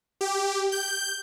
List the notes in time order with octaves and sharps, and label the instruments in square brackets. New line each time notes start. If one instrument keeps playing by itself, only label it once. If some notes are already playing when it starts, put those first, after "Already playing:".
[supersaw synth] G4
G6